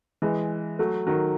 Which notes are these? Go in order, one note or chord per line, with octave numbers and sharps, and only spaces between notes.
E3 G#3
F#3 A3
D#3 F#3